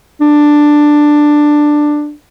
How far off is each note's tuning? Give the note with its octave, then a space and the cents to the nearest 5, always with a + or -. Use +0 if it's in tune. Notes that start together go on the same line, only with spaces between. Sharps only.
D4 +10